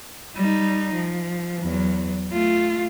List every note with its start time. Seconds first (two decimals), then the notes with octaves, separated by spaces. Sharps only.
0.36 G3 D#4
0.95 F3
1.63 E2 F#3
2.33 A3 F4